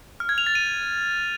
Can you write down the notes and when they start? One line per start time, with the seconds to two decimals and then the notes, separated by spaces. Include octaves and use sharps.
0.20 F6
0.29 G#6
0.38 F7
0.47 A6
0.55 D#7